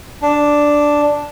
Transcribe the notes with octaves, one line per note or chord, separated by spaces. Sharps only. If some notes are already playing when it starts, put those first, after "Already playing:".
D4